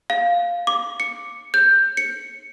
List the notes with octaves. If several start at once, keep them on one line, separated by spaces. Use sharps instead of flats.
F5
D6
C#7
G6
C#7